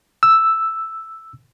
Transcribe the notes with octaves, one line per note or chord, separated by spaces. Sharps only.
E6